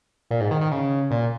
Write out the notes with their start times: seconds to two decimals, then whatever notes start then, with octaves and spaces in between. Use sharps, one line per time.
0.31 A#2
0.41 G#2
0.51 D#3
0.61 D#3
0.72 C#3
1.11 A#2